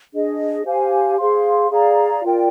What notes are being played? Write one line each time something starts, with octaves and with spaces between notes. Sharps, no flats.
D4 G#4 D#5
G4 C5 F5 G#5
G#4 C5 F5 C6
G#4 D5 F5 A#5
F4 A#4 D5 G5